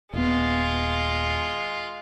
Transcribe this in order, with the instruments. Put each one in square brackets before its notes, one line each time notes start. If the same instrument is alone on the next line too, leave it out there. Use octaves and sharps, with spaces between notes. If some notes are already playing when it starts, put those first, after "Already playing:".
[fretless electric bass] D#1 B3 [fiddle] G#3 F4